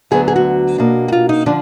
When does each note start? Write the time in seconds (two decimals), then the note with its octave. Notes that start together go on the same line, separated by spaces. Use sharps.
0.11 D2 D3 F#3 B3 G#4
0.28 G#4
0.36 F#4
0.78 B2 A#3 D4
1.08 F#4
1.12 F4
1.29 D#4
1.46 D3 F3 D4